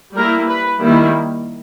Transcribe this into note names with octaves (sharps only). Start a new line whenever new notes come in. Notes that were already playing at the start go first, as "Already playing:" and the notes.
G3 A#3 E4 A#4
B4
D#3 G3 A#3 E4